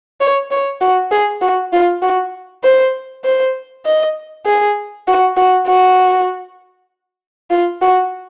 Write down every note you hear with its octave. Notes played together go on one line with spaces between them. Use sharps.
C#5
C#5
F#4
G#4
F#4
F4
F#4
C5
C5
D#5
G#4
F#4
F#4
F#4
F4
F#4